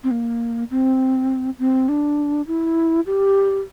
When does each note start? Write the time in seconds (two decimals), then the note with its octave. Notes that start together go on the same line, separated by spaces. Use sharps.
0.04 C4
0.11 A#3
0.71 C4
1.59 C4
1.89 D4
2.47 E4
3.06 G4